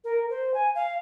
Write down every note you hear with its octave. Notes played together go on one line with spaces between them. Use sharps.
A#4
C5
G#5
F5